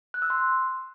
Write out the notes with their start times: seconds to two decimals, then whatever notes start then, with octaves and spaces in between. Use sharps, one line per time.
0.14 F#6
0.22 E6
0.30 C6